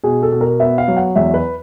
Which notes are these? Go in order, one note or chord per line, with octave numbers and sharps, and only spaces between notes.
B2 G#4
A4
B2
A#4
B3 E5
F5
F#3
F#5
E2 E5
B4